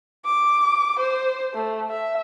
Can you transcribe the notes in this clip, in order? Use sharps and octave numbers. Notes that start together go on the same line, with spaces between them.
D6
C5
A3
E5